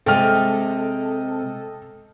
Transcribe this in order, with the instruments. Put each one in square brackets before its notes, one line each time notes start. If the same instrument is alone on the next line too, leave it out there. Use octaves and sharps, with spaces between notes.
[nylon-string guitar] C3 G#3 [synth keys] A4 D#5 [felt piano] G5 F6